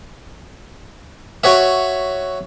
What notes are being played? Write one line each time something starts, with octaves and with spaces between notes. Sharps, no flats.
F#4 C#5 E5